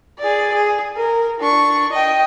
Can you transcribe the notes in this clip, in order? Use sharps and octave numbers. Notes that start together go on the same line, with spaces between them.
G#4 D5
G#4
A#4
D4 C#6
D#5 G5